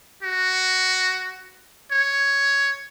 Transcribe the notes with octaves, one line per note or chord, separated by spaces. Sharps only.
F#4
C#5